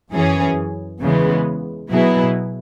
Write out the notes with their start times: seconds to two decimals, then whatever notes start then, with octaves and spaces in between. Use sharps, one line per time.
0.11 F#2 E3 C#4 G#4
1.00 E2 C#3 E3 G#3 B3
1.90 B2 F#3 B3 E4 G#4